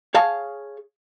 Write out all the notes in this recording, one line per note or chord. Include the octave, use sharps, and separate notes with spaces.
G#4 C#5 F5 A5